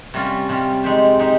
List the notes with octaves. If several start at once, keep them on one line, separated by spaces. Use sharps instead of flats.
C3 G3 C#4 F4
C3 G3 C#4 F4
G#3 D#4 G4 C5
G#3 D#4 G4 C5